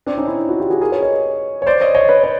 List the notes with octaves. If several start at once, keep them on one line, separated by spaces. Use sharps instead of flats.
C4 D4
C#4 D#4
D4 E4
E4 F#4
F4 G4
F#4 G#4
G#4 A#4
B4 C#5
C#5 D#5
C#5
C5 D5
C#5 D#5
C#5 D#5
B4 C#5
C#5